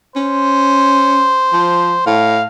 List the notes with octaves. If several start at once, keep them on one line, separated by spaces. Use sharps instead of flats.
C#4 C5
F3
A2 F5